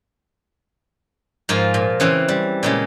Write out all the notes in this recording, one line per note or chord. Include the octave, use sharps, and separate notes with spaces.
G#2 F3 F4 A#4 C6
A#2
C#3 E3 C4
G3
A#2 C#3 G#3